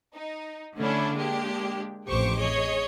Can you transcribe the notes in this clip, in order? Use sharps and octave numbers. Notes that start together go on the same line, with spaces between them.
D#4
D3 A3 C#4 D4 E4
G#3 A#3 D4 G4
A1 F2 G4 C5 C#6 D6
G#4 C#5 D#5